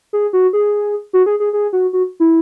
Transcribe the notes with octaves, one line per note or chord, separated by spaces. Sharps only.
G#4
F#4
G#4
F#4
G#4
G#4
G#4
F#4
F#4
E4